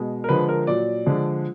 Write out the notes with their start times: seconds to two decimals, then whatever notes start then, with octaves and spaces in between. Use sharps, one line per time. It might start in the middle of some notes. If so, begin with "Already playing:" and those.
Already playing: B2 G#3
0.24 A#4
0.29 D3 F3 G#3 B4
0.49 A#4
0.67 A#2 F#3 D5
1.06 D3 F3 G#3